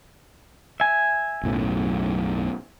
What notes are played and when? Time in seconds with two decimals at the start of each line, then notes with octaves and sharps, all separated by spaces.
0.80 E5 G#5
1.44 B1 F#2 A2